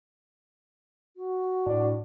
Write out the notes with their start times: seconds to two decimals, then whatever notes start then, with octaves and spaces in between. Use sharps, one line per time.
1.16 F#4
1.66 A2 D4